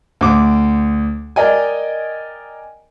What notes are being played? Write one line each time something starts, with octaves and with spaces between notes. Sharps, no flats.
D2 D6
A#4 D5 D#5 G5 G#5